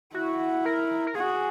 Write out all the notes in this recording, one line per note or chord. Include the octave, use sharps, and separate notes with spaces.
E4 F#4
A#4
A#4
F#4 G#4